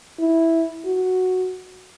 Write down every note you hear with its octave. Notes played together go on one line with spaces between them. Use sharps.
E4
F#4